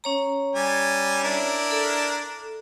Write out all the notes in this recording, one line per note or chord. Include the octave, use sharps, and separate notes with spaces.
C#4 C#5 A#5
G3 G#5
D4 E4 A#4
A4